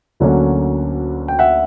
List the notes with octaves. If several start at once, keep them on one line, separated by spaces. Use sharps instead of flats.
D2 D3 F#3 A#3 C#4
G5
E5 F#5